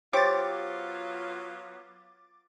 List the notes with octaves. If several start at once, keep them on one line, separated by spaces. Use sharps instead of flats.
F#3 B3 F4 G4 C5 C#5 D6 A6